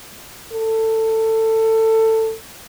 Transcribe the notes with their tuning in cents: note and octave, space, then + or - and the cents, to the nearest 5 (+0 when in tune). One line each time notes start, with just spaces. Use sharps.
A4 +20